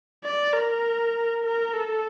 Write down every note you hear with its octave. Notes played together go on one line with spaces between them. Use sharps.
D5
A#4
A#4
A4